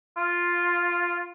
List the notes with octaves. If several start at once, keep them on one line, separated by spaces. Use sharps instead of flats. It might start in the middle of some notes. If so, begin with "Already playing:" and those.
F4